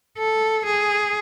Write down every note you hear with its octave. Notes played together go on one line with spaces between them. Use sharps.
A4
G#4